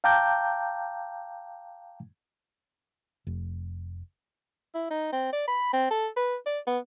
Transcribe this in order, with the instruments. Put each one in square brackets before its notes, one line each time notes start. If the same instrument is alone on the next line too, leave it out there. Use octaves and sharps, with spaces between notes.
[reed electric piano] F5 G5 A5 A#5 D6 G6
[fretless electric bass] F1
[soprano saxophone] E4
D#4
C4
D5
B5
C4
A4
B4
D5
B3